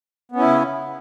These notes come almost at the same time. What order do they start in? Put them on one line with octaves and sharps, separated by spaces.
B3 C#4 E4 C#3